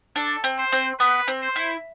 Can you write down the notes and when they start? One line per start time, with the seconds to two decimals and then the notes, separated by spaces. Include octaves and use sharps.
0.16 D4 A4
0.44 C4
0.58 C5
0.72 C4
0.99 B3 B4
1.28 C4
1.42 C5
1.56 E4